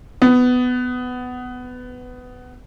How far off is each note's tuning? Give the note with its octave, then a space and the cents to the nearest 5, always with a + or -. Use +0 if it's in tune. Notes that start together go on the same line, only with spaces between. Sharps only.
B3 +15